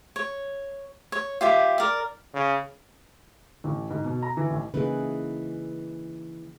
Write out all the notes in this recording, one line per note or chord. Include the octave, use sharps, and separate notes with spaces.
C#5
C#5
F4 G4 E5
A#4 D5
C#3
A1
G#2
B2
A#5
E3
A1
C#3 E3 A#3 D#4 G#4 B4